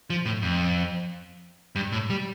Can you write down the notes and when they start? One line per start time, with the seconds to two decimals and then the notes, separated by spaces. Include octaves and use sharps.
0.10 F3
0.26 A2
0.42 F2
1.75 G2
1.92 A2
2.10 G3